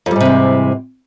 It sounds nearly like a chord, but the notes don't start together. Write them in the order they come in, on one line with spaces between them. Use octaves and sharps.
F2 G3 G#2 C3 E3